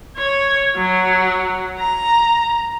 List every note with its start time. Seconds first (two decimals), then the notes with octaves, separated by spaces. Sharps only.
0.17 C#5
0.76 F#3
1.79 A#5